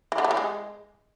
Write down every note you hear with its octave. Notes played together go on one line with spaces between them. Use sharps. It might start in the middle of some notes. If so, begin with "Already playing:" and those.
E3
D3
A3
E3
G#3